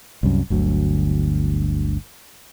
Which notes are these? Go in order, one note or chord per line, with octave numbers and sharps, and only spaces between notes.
C2 F#2
G1 D2 F#3